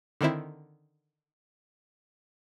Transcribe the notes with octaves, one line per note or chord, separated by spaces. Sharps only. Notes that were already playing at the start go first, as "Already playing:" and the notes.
D3 D#3 C4 E4